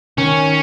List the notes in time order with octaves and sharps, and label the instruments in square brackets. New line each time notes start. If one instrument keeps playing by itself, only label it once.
[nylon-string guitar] D#3 [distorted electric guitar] C#4